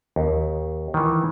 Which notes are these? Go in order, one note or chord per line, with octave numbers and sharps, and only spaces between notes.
D#2
D#3 E3